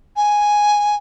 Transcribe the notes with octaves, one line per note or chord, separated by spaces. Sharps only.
G#5